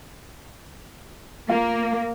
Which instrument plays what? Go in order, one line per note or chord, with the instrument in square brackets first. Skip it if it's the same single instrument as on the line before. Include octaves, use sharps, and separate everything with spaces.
[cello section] A#3 [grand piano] F4